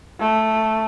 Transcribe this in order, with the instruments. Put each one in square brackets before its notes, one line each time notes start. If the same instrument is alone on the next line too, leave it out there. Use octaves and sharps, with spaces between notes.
[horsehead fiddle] A3